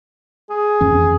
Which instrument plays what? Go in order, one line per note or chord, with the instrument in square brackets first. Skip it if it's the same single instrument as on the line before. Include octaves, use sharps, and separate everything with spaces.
[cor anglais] G#4
[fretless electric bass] F2 E3 C#4